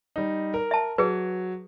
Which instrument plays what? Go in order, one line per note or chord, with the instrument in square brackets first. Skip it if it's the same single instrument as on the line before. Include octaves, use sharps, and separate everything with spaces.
[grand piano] G3 D#4
A#4
[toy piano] E5 A5
[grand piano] F#3 [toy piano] G#4 B4